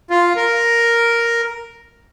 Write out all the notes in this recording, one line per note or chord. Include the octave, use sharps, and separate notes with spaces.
F4
A#4